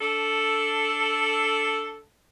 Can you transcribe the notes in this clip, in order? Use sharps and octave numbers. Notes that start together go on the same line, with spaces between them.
D4 A4